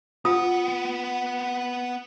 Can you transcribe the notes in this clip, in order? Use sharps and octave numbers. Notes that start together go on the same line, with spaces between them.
B3 F4 F#5 D#6